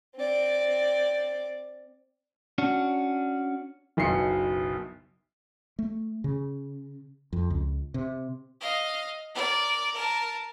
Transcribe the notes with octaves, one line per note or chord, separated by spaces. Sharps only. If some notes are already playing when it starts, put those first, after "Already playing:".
C4 D5
C#4 D4 F#4
F#1 B1 B2 C7 C#7
A3
C#3
F2
C#2
C3
D#5 F5
A#4 D5
A#4 A5